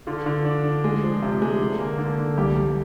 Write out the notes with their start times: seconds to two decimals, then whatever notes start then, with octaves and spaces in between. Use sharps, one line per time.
0.07 D3 F4
0.26 D3
0.45 D4
0.64 D4
0.84 G#3
1.03 F3
1.22 C3
1.42 G#3
1.61 D3
1.79 A#3
1.98 D3
2.18 D3
2.38 C2 G4
2.56 C2